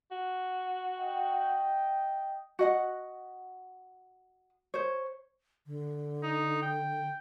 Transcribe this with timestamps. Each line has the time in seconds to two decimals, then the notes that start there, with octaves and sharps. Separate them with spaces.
0.11 F#4
0.99 D#5 G5
2.59 F#4 D#5 F#5
4.74 C5 C#5
5.66 D3
6.23 D#4
6.62 G5